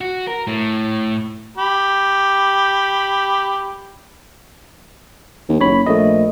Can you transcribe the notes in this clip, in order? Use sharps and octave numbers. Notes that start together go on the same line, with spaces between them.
F#4
A#4
A2
G4 B5
D#2
F#1 C#5 B5
A#1 A3 D#5